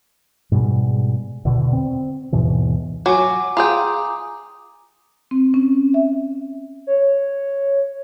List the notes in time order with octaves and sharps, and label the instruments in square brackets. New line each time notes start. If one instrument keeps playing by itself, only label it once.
[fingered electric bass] G#2 B2 G3 G#3
E2 B2 D3
C4
D#2 G#2 B2 E3
[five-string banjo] F#3 [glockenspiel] G#5 D6
[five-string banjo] F4 G#4 G5 [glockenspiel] A#5 D#6
[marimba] C4
C#4
E5
[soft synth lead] C#5